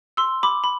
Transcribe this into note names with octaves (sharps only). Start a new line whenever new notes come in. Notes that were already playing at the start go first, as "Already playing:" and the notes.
C6 E6
B5 D6
B5